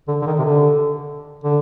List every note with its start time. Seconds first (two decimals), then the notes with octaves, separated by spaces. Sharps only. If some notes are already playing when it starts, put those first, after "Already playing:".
0.08 D3
0.22 D3
0.27 D#3
0.39 C3
0.44 D3
1.44 D3